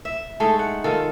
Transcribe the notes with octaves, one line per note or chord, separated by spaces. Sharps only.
E5
G#3 A3 D#4 A4
F#5
D#3 F4 A4